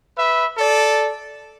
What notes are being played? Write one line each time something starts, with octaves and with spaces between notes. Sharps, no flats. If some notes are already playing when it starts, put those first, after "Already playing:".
B4 E5
A4 D5